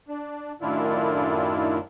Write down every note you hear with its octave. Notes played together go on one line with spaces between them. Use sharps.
D4
F#2 A2 D#3 D4 E4 F4